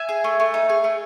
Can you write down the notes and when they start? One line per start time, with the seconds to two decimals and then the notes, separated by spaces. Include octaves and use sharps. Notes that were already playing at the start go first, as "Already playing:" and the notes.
Already playing: E5 G#5
0.09 G#4
0.24 A3
0.40 A3
0.54 D#4
0.69 G#4
0.84 A3